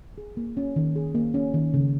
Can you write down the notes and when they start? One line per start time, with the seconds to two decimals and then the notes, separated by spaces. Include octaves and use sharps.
0.18 G#4
0.37 A#3
0.57 C#4
0.76 D#3
0.96 G#4
1.15 A#3
1.34 C#4
1.54 D#3
1.74 C#3